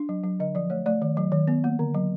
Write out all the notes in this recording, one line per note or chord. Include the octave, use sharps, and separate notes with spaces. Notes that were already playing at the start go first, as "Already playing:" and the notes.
Already playing: D4
F#3
F#3
D3 D#5
F3 D5
A3 C#5
A3 D5
D#3
F#3
D#3
B3
A#3
D3
F#3